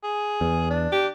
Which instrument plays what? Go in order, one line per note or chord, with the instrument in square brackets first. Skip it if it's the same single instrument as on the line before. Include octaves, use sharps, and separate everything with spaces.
[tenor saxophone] G#4
[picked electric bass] E2
[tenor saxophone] D4
[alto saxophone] G4